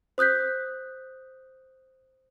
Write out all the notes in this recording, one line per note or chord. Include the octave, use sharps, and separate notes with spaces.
C5 D#6 F#6 G6 B6